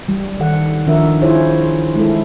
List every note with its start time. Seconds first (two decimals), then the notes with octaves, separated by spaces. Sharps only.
0.08 G3 G4
0.40 D#3 A4 F#5
0.87 D#3 F3 D4 F4 A#4 E5
1.22 E4 F4 G#4 C5 C#5
1.95 G#3 E4 A4